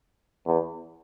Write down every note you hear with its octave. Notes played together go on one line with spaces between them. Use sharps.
E2